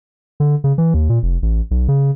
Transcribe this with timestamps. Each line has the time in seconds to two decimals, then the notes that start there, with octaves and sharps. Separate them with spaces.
0.40 D3
0.64 C#3
0.78 E3
0.94 D#2
1.09 A#2
1.23 F1
1.42 A1
1.71 B1
1.88 C#3